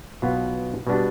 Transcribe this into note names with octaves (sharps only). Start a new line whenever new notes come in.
B1 B2 B3 F4
B2 G3 B3 D4 G4